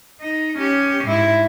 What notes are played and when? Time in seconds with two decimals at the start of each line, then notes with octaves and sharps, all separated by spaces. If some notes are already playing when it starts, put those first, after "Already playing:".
0.21 D#4
0.58 C#4 G4
1.04 G#2 E4